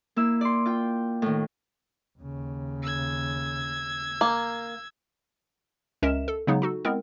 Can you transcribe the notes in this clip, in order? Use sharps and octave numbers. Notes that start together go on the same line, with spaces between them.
A#3 E4 E6
D5 C6
F4 G5
A2 D#3
D#2 C#3
E6 G#6
A#3
C#2 C#4 A#4 D#5 E5 E7
A4
C#3 F#3 G#3 B3 D#4
D#4 F#4 A4
G#3 B3 C4 E4 A#4